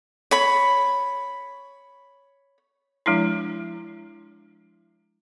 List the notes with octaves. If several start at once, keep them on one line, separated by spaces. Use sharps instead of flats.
C#5 B5
F3 G#3 D4 E4